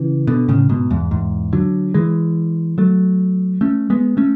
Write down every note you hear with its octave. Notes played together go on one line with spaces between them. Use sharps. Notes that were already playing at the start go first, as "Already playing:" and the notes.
Already playing: C#3 E3
B2 D3
A2 C#3
G#2 B2
E2 G#2
E2 G#2
D3 F#3
E3 G#3
F#3 A3
A3 C#4
G#3 B3
A3 C#4